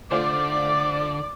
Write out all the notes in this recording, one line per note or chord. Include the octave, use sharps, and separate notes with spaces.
D3 A3 F4 C5 D5 D6